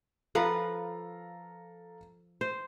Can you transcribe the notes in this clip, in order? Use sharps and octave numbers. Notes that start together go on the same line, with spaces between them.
F3 A4 B4 F5 F#5 A#5
C5